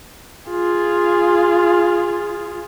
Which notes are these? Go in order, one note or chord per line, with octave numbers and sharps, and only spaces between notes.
F4 G#4